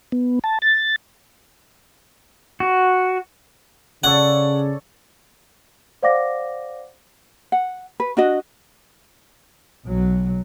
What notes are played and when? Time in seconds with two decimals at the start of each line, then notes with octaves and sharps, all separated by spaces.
0.12 B3
0.44 A5
0.62 A6
2.60 F#4
4.04 C#3 A4 C#5 D5 F#5
6.03 C5 D5 F5 F#5 D6 A#6
7.52 F#5
8.00 B4
8.17 D4 F#4 D#5
9.85 B1 F#3